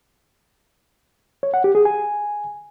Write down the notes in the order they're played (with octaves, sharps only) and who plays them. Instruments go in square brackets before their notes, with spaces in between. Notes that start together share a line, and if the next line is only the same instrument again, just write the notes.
[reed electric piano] C#5
F#5
G4
G#4
G#5